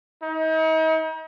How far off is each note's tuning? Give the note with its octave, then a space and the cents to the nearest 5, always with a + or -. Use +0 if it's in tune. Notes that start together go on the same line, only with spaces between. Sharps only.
D#4 +40